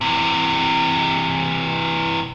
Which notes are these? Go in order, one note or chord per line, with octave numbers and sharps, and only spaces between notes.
C3 E3